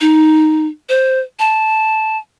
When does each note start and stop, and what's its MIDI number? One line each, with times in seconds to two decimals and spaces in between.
0.01 0.67 63
0.89 1.20 72
1.39 2.18 81